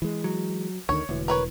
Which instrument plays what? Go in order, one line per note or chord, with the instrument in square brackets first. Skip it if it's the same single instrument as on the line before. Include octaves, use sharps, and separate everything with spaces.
[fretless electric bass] E3 G#3
[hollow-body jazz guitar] F#3
[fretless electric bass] D2 D3 D#3 [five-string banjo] C#5
[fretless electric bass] E1 E3 [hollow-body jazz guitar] D2
[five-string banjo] A#4 B4 C#5